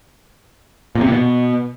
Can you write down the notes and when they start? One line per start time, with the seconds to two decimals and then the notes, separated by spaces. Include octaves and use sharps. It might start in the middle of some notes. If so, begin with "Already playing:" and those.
0.95 A#2
1.01 C3
1.07 A#2
1.12 B2